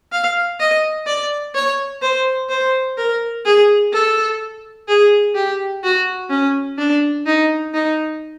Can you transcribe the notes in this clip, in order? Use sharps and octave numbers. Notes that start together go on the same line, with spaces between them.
F5
D#5
D5
C#5
C5
C5
A#4
G#4
A4
G#4
G4
F#4
C#4
D4
D#4
D#4